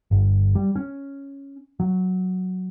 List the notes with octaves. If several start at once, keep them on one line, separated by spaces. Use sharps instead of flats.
G1
G3
C#4
F#3